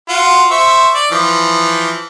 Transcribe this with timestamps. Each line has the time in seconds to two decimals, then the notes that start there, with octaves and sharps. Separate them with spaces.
0.09 F4 F#4
0.51 C5 E5 C#6
0.95 D5
1.11 E3 F3